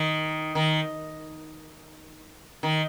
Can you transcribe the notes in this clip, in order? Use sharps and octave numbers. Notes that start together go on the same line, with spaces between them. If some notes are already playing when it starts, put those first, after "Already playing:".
Already playing: D#3
D#3
D#3